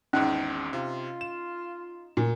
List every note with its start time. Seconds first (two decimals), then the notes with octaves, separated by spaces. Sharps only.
0.13 G#1 E2 G#2 C#4 D#4
0.73 C3 F4
1.21 E7
2.17 A#2